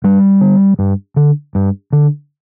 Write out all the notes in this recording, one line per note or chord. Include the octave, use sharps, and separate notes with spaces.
G2 G3
D3
G2
D3
G2
D3